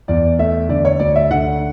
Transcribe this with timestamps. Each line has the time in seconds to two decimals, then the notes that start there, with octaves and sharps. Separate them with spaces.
0.08 E2 D5
0.39 A3 E5
0.69 D3 D5
0.85 C#5
0.99 D2 D5
1.16 E5
1.31 D3 F#5